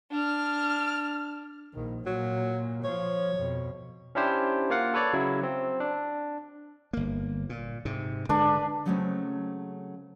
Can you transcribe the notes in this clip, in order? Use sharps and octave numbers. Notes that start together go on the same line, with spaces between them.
D4 F6
A#1 D#3
A#2 F#3
F3 C#5
F2 B2
C#4 D4 E4 G4 C5
A#3 F4 F5 F#5
A4 B4 C#5 D5
C#3 F#3 E4
C4
D4
G1 A#3
A#2
G#2 C3
D3 G#3 D4 B4
C#3 F#3 G#3 A3 C4 C#4